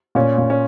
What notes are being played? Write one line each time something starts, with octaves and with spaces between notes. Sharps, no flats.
A#2 C#4
A#2
C#4